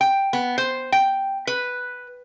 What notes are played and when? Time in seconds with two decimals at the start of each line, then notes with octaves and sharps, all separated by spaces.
0.01 G5
0.33 B3
0.58 C5
0.92 G5
1.47 B4